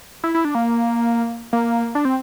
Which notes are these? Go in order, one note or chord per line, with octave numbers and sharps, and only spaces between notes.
E4
E4
D4
A#3
A#3
D4
C4